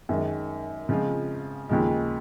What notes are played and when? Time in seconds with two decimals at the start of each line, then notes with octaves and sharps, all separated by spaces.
0.09 F#2 D#3 G#3
0.89 C#3 F3 G#3 C4 F4
1.69 D#2 C#3 F3 G#3